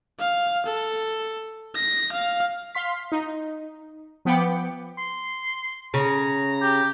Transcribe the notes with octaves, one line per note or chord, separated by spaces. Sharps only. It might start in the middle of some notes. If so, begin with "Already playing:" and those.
F5
A4
A#6
F5
F5 C6 B6
D#4
F3 B3 G5 B5 D6 C#7
C6
C#3 A#5
G4